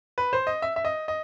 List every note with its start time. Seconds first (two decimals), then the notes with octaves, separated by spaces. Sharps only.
0.18 B4
0.33 C5
0.47 D#5
0.62 E5
0.76 E5
0.85 D#5
1.08 D#5